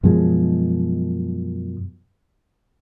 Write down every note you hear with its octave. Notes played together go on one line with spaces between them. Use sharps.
F#2 B2 F3 G#3